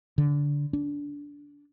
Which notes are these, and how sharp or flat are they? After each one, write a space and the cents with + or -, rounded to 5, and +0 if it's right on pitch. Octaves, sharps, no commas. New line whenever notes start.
D3 -15
D4 -20